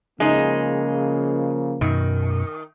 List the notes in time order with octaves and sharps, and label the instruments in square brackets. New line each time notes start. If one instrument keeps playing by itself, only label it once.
[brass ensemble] C#3 F3 A#3 [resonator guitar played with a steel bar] G#3 D#4
[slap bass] F#2 B2 [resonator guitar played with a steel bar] D#3